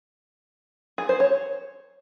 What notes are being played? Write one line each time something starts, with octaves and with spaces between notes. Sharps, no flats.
G#4
C5
C#5